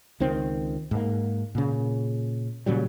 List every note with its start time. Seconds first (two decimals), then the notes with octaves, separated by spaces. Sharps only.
0.20 C#2 D#3 C4
0.91 G#2 A#3
1.55 A#2 C#3
2.66 A#2 C#3 F#3 G3